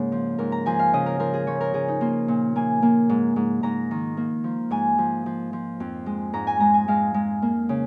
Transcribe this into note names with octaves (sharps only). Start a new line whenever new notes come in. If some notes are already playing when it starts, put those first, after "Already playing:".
Already playing: G#2 C#3 A#3
F3
G#2 A#4
A#5
F3 G#5
F5
C#3 D#5
A#4
F3 A#4
G#4
F3 C#5
A#4
C#3 G#4
D#4
A#3 F4
A#2
A#3 G#5
A#3
G#2
G#2
G#2 A#5
D#3
A#3
F3
G#2 G#5
F3
F3
F3
F2
G#3
G#2 A#5
G#5
G#3 A#5
G#5
G#3 F5
G#3
A#3
C#3